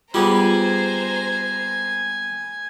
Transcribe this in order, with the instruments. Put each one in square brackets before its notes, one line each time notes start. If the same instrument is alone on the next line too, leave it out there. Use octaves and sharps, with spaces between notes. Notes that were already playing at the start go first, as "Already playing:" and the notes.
[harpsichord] G3 B3 [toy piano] F4 G#4 [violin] C5 A#5 [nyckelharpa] G#5